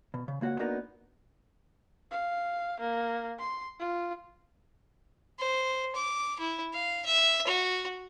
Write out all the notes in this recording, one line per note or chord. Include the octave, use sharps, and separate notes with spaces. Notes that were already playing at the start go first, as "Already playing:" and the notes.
B2
C#3
C#2 A#3 F#4 C#5 F#5
A#3 B3 D4 D#4 F#4 A#4
F5
A#3
C6
F4
C5
D6
E4
F5
E5
F#4